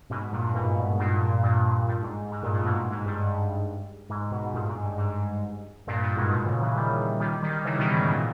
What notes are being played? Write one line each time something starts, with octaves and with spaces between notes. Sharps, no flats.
G#2 B2
G2 A#2
G#2 B2
G2 A#2
G2 A#2
G2
G#2
G#2
G2 A#2
G2 A#2
G#2 B2
G#2
G2
G#2
G#2 B2
G2 A#2
G#2
G2
G#2
G2 A#2
G2 A#2
G#2 B2
G#2 B2
A#2 C#3
C#3 E3
D#3 G3
D#3 G3
D#3 G3
C#3 E3
B2 D#3
G#2
A#2